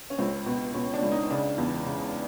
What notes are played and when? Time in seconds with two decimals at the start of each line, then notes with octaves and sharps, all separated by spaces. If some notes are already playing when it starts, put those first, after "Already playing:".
0.10 C#4
0.18 C#2 C4
0.46 B2
0.74 B2 C#4
0.94 D4
1.02 C#2
1.12 D#4
1.31 C#3 D4
1.58 E2
1.86 C#3